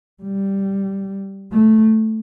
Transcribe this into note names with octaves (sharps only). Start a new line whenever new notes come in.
G3
A3